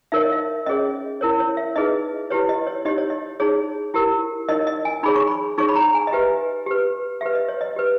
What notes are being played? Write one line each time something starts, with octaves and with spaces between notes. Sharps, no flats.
D#4 A#4 C#5 E5
D#5
E5
C#4 G#4 C#5 D#5
E4 A#4 C#5
C#5
E5
D#4 G#4 B4 D#5
E4 G4 B4 C#5
D#5
C#5
D#4 G4 C#5 D#5
C#5
D#5
D#4 G#4 C#5
E4 G4 A#4
D#4 A#4 C#5 D#5
D#5
G#5
D#4 G#4 C#5 B5
C#6
B5
D#4 G#4 C#5 C#6
B5
A#5
G#5
D#5
G4 B4 E5
G4 B4
G4 B4 E5
D#5
C#5
D#5
G4 B4